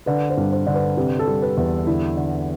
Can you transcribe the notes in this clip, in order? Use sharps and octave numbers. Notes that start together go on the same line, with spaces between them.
D3 B4
C5
G2
C5
D3
B4
C3 B4
A4
G3
B4
E2
D3 E4
D3